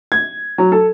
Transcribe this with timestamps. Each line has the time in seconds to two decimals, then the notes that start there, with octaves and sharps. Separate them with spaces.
0.12 G#6
0.58 F#3
0.72 A4